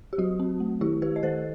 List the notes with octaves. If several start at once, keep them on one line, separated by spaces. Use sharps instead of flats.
G4
F#3 F#4
C4
A3
D#3 E4 G4
D#3 G4 B4
D#5
D#3 A4 C5